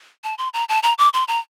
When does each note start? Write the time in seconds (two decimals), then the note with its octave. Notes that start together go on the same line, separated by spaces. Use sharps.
0.24 A5
0.38 C6
0.54 A#5
0.69 A5
0.83 A#5
0.98 D6
1.14 C6
1.28 A#5